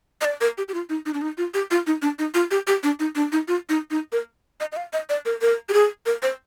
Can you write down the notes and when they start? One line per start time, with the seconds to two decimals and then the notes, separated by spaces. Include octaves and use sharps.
0.21 D#5
0.25 D5
0.41 A#4
0.58 G4
0.68 G4
0.74 F4
0.90 D#4
1.06 D#4
1.14 D4
1.22 D#4
1.38 F4
1.54 G4
1.71 F4
1.87 D#4
2.02 D4
2.19 D#4
2.34 F4
2.51 G4
2.67 G4
2.83 D4
3.00 D#4
3.16 D4
3.32 D#4
3.48 F4
3.69 D#4
3.91 D#4
4.12 A#4
4.60 D#5
4.72 D#5
4.77 F5
4.93 D#5
5.09 D5
5.26 A#4
5.42 A#4
5.69 G4
5.73 G#4
6.06 A#4
6.23 C5